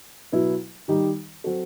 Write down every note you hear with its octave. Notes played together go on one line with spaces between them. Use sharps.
B2 F#3 B3 E4
D#3 G3 D#4 G4
F#3 C4 F#4 A4